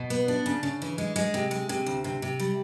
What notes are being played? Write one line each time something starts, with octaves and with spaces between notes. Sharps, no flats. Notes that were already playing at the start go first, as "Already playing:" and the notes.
Already playing: B2
B3
D4
C#3
C#3
E3
G#3
G#3
C3
G#3
C3
D2
C3
C3
G3